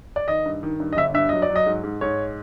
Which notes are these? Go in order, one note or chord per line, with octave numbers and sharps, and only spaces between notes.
D5
D#3 D#5
G2
D#3
G2
D#5
G1 E5
G2 E5
F#3 D#5
D5
F#3
D#5
G#2
G#2
G#2 C#5